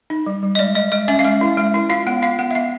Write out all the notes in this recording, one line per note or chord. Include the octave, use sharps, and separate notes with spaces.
D#4
G3
G3
D#5
G#3 D5
G#3 D#5
G#3 D#5
C#4 E5
F5
G#3 E5
E4
G#3
E4
F4 F5
B3 F#5
F4 F5
B3 F#5
E5
B3 F5